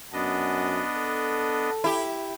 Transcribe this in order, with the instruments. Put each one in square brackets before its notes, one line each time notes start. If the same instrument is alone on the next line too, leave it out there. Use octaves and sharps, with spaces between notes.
[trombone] F#2 [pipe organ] B3 D4 D#5
[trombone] A4
[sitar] E4 G4